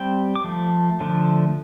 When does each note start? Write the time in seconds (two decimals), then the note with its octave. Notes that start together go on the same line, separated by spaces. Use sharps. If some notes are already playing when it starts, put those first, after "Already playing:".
Already playing: G3 C4 G5
0.35 D6
0.44 F3 A3
1.00 D3 F3 A3 D4